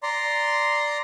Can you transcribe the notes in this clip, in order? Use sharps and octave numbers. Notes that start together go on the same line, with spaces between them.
D5 A#5 C6